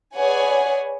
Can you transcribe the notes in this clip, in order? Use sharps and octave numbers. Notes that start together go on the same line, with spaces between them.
G#4 B4 C#5 D5 F#5 G#5